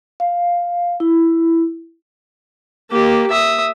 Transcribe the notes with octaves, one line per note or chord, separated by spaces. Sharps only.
F5
E4
A#3 G4
E5 D#6